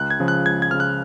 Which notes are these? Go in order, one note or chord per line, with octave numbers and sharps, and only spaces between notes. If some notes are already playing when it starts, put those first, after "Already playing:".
Already playing: C#2 F#6
G#6
C#3 F3
F#6
C#2 G#6
G#6
C#3 F3 F6
F#6